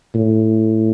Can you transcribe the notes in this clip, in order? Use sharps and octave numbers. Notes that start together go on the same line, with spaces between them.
A2